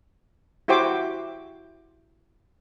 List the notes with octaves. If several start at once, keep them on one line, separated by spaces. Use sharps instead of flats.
E4 F#4 G4 C5 G5 D6